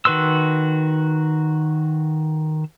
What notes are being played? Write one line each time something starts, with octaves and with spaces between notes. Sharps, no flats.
D#3 F#4 B4 C6 E6